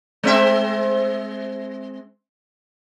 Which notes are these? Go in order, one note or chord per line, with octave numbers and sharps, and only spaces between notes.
G#3 C4 E5